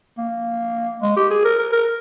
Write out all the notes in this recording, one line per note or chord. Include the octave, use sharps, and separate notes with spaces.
A#3
G#3
G4
G#4
A#4
A#4
A#4